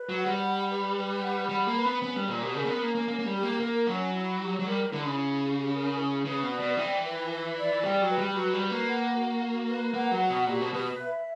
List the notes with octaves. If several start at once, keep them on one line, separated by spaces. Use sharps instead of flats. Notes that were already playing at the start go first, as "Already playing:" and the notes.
Already playing: B4
F#3
F#5
G3
B5
B4
B4
F#5
G3 B5
A#3
B4
B3
B3 C#4
G3
A#2 G4
B2
C#3 A#4
A#3
B3
A#3 C#4
A#3
A#3 C#4
A#3
G3
G4
A#3
A#3 A#4
F#3 C#4
E4
G4
F#3
G3 A#4
D3 E4
C#3
E4
G4
A#4
E4
C#3 B4
B2
D5
B2
E3 G5
B4
B4
D5
G3 G5
F#3
B4
G3
F#3 F#4
G3
B4
A#3
F#5
F#4
F#4
B4
A#3 F#5
F#3
F#4
B2
A#2 G4
B2
B2 B4
E5